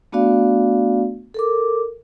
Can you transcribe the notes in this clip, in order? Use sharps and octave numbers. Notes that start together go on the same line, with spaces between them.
A3 B3 D4 F#4 D5 F5
A4 A#4 D6